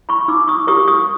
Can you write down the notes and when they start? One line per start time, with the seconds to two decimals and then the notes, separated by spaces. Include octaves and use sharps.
0.09 B5 C#6
0.28 D#4 D6 E6
0.48 C#6 D#6
0.67 G4 A#4 C#6 D#6
0.88 C#6 D#6